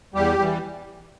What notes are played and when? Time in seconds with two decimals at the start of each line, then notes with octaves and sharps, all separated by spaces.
0.14 E2 G3 G4
0.38 E3 G3